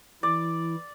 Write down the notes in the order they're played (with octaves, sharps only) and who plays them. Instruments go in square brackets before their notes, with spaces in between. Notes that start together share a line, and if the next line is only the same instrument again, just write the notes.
[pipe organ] E3 E4 [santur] D5